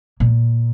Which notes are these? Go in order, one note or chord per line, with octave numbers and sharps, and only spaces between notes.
A#2